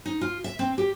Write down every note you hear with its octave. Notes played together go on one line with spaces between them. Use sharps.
D#4
F4
E5
C4
G4